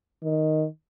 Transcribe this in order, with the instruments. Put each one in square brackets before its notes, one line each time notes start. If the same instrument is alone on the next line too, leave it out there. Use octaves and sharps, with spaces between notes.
[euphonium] D#3